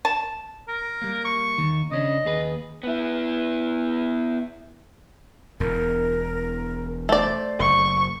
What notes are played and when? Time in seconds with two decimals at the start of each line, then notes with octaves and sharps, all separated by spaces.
0.05 A5
0.68 A#4
1.02 G3 A#3
1.25 C#6
1.58 D#2 D#3
1.91 C#3 C#4 D4 D#5
2.25 D#2 G#4 B4
2.83 B3 E4
5.60 E1 E2 A#4
7.09 A3 C5 D5
7.60 F#1 C#6